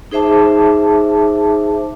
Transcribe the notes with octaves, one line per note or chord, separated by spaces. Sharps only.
D#4 G#4 C5 E5 A5 D6